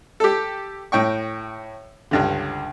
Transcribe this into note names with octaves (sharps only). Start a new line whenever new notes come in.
G4 A4
A2 G5 C#6
C#2 G2 D3